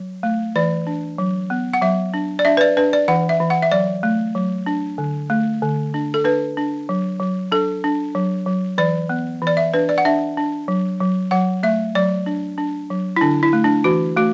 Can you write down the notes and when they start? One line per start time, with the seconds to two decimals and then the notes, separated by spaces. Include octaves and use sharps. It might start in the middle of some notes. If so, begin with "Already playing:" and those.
Already playing: F#3
0.23 A3
0.56 E3 D5
0.87 D4
1.18 F#3
1.50 B3
1.73 F#5
1.81 F#3 E5
2.14 D4
2.39 D5
2.45 D4 E5
2.57 B4
2.61 D5
2.77 D4 B4
2.93 D5
3.08 E3 F#5
3.29 E5
3.40 E3
3.50 F#5
3.62 E5
3.71 F#3 D5
4.03 A3
4.35 F#3
4.66 D4
4.98 D3
5.30 A3
5.62 D3
5.94 D4
6.14 A4
6.25 D4 B4
6.57 D4
6.89 F#3
7.20 F#3
7.52 D4 A4
7.84 D4
8.15 F#3
8.46 F#3
8.78 E3 D5
9.09 B3
9.42 E3
9.47 D5
9.57 E5
9.74 D4 B4
9.89 D5
9.98 F#5
10.05 D4 E5
10.37 D4
10.68 F#3
11.00 F#3
11.31 F#3 F#5
11.63 A3 E5
11.95 F#3 D5
12.26 D4
12.58 D4
12.90 F#3
13.16 E4
13.21 D3 D4
13.43 E4
13.53 A3
13.64 D4
13.84 E3 F#4
14.17 A3 F#4